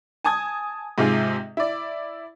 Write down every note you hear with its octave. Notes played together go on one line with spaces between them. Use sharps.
G#5 A5 D#6 G#6
G#2 C3 D#4 F4 G#4
E4 D5